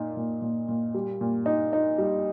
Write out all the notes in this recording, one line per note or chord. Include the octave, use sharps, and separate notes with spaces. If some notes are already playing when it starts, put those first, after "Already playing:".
Already playing: A#2 D#4
A#2
A#2
A#2
G3
A#2
D#4
D#4
G3